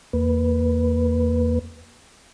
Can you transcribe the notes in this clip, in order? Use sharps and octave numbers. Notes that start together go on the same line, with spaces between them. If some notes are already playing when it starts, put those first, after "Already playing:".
E2 A#3 B4